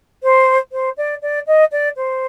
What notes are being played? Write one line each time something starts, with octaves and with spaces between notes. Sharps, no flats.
C5
C5
D5
D5
D#5
D5
C5